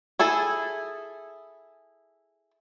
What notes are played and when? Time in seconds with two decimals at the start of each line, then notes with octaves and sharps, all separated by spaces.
0.19 E4 G#4 A4